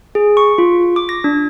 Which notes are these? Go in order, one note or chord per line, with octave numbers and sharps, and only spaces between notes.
G#4
C#6
F4
D6
A#6
D4